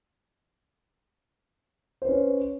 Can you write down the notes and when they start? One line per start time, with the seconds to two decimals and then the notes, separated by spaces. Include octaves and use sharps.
2.02 C5
2.05 B4
2.09 C#4